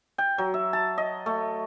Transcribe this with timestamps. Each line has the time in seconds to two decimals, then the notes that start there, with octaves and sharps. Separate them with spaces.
0.18 G5
0.38 F#3
0.54 E5
0.73 A5
0.98 D#5
1.26 A3